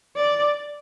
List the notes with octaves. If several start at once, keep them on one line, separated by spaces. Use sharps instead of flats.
D5